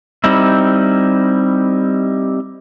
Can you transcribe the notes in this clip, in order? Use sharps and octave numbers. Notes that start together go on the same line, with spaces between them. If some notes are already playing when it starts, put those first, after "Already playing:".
G3 C4 D#4 E4